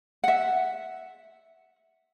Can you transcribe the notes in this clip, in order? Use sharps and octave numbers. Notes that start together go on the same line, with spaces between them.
E5 F#5